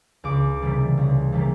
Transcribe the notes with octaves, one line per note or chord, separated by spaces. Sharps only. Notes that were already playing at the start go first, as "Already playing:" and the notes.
C#2 D6
C3 E3 G3 A#3
C#2
C3 E3 G3 A#3